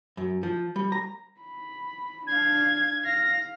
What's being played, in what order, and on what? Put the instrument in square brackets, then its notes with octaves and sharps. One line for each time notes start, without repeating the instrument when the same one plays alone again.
[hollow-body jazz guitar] F#2
F3
G3
A#5
[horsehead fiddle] B5
[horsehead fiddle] D4 F5 [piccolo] G#6
[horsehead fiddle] F5 [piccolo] A#6